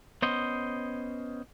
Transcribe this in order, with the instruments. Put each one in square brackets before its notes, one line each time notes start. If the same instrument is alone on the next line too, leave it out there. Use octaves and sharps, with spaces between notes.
[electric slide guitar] B3 C#4 C5 D#5